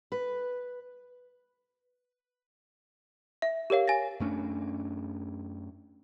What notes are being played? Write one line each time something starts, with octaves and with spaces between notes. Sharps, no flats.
B4
E5
G4 A#4 C#5 F5
G#5 A6 A#6
F#2 A3 C#4 D4